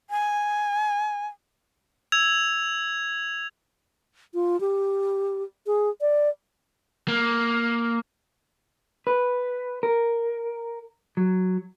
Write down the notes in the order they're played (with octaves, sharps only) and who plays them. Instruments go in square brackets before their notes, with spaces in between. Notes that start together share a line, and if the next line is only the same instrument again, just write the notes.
[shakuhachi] G#5
[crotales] E6 G#6 F7
[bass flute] F4
G4
G#4
D5
[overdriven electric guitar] A#3
[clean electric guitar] B4
A#4
F#3